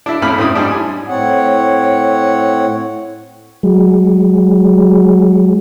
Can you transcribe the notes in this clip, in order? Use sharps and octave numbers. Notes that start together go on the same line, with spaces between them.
D4 E4
F2 A2 C#4 B5 F6
A2 C4 C#4 C5 D#6
G#2 G3 G#3 D4
G#5 D#6
A2 C4 C#5 F#5
F#3 G#3